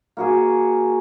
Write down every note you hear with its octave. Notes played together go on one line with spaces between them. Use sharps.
A#3 F#4 G#4